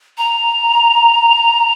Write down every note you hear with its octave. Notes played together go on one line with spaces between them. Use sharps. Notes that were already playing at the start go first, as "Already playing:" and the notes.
A#5